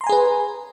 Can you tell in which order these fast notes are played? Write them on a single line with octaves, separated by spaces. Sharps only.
C6 A#5 G#5 G#4 B4